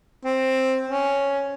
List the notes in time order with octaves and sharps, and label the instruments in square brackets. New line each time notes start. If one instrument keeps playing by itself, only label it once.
[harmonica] C4
C#4